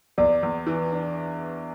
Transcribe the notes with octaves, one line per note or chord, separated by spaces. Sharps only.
E2 D5
E2
E3
D4